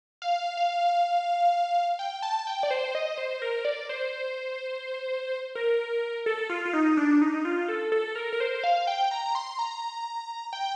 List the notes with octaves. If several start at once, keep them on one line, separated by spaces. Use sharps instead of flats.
F5
F5
G5
A5
G5
D5
C5
D#5
C5
A#4
D5
C5
A#4
A4
F4
F4
D#4
D4
D#4
F4
A4
A4
A#4
A#4
C5
F5
G5
A#5
A#5
C6
A#5
G5